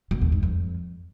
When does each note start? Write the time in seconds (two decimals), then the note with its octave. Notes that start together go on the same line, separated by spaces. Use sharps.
0.11 B2
0.22 E2
0.32 G#2
0.43 F2